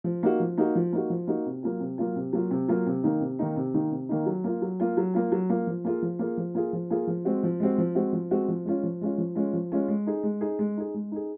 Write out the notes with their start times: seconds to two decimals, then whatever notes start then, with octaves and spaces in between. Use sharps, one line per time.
0.04 F3
0.23 A#3 D#4 F#4
0.40 F3
0.58 A#3 D#4 F#4
0.75 F3
0.93 A#3 D#4 F#4
1.10 F3
1.27 A#3 D#4 F#4
1.46 C3
1.63 F#3 A#3 F4
1.80 C3
1.98 F#3 A#3 F4
2.16 C3
2.33 F#3 A#3 F4
2.51 C3
2.68 F#3 A#3 F4
2.86 C3
3.03 D#3 A#3 D#4
3.21 C3
3.39 D#3 A#3 D#4
3.56 C3
3.74 D#3 A#3 D#4
3.91 C3
4.09 D#3 A#3 D#4
4.26 F#3
4.44 A#3 F4
4.62 F#3
4.80 A#3 F4
4.97 F#3
5.14 A#3 F4
5.32 F#3
5.50 A#3 F4
5.67 F3
5.84 A#3 F4 G#4
6.02 F3
6.19 A#3 F4 G#4
6.37 F3
6.54 A#3 F4 G#4
6.73 F3
6.90 A#3 F4 G#4
7.07 F3
7.25 G#3 C4 F#4
7.43 F3
7.60 G#3 C4 F#4
7.78 F3
7.95 G#3 C4 F#4
8.13 F3
8.31 G#3 C4 F#4
8.48 F3
8.65 G#3 C#4 F4
8.83 F3
9.01 G#3 C#4 F4
9.18 F3
9.35 G#3 C#4 F4
9.53 F3
9.72 G#3 C#4 F4
9.88 G#3
10.07 D#4 G#4
10.23 G#3
10.41 D#4 G#4
10.59 G#3
10.77 D#4 G#4
10.94 G#3
11.12 D#4 G#4